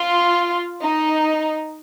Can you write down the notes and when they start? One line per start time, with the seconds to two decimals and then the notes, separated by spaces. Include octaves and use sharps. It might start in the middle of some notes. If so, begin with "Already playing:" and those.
Already playing: F4
0.82 D#4